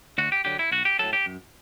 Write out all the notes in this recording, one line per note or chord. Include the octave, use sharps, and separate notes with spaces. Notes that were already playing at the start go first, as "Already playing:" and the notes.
D2 F#4
G4
D3 F#3 G4
E4
B1 F#4
G4
A2 F#3 A4
G4
F#2